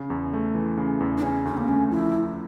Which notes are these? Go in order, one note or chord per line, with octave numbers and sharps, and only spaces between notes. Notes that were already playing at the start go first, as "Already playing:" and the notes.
Already playing: C#3
E2
A3
E3
C#3
E2
D4
C#3 C#4
D2 C#4
A#3
A3 C#4
F3 E4